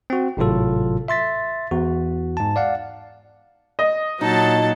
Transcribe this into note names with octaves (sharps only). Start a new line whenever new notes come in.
C4 F#4
G#1 A2 C3 F#3 F4 A4
E5 C6 A6 B6
E2 F#4
G#2 A5
D5 F5 F#5
D#5
A#2 F#3 D#4 A4 A5